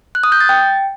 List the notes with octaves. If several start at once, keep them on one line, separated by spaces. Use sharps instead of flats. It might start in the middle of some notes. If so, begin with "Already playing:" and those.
F#6
D#6
G6
A6
G5